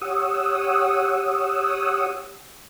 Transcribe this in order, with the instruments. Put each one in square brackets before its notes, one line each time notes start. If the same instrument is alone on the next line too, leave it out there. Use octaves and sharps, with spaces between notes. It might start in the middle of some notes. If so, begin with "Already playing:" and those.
[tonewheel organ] G4 C#5 F#5 D#6 E6